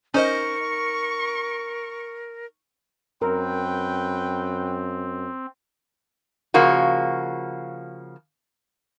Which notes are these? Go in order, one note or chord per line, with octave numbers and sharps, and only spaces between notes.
C#4 D#4 A#4 C5 D#5 C#6
F#2 C4 A#4 B4 G5
C#3 F3 A#3 F#4